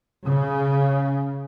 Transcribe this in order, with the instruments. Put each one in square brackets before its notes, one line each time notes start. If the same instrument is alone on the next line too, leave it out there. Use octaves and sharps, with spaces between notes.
[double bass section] C#3